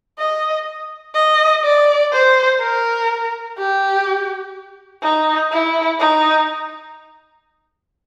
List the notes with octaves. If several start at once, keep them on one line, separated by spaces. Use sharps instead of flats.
D#5
D#5
D5
C5
A#4
G4
D#4
E4
D#4